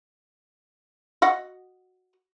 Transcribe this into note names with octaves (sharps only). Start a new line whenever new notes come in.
F#4 D#5 F#5